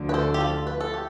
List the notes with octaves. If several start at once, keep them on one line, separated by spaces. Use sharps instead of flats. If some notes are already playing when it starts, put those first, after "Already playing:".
Already playing: D2 D3 F3
B4
A4 C5
G4
F4 A4
B4
A4
G4